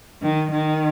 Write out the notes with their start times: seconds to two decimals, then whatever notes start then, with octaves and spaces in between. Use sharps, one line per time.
0.22 D#3
0.51 D#3